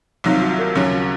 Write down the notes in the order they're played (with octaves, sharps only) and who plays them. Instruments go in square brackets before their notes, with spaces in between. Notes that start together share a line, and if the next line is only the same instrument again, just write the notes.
[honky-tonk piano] C2 C3 D#3 F#3 [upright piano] F4
[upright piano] F#4
A#4
[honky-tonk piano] D#2 C#3 F#3 C#4 [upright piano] A#4
[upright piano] F#4